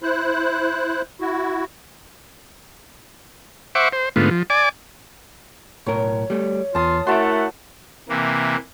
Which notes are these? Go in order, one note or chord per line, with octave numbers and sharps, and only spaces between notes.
E4 C5 F#6
E4 F#4
C5 E5 F#5 C#6 D6
C5
G#2 D3 A3 B3 F4
F3
D5 G#5 D6
B1 A2 A#4 C#5
G3 A3
E2 F4 A5 D#6
A3 E4 F#4 A#4 E5 F#5 A5 C6
C3 E3 A#3